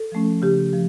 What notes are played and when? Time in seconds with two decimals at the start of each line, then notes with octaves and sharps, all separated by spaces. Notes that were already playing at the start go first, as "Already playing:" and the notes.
Already playing: A4
0.12 F3 A3 C#4
0.42 C#3 G4
0.73 F3